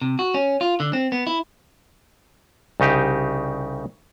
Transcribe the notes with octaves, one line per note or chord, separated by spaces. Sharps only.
C3
F#4
C#4
F4
D3
C4
B3
E4
C2 C#3 D#4 G4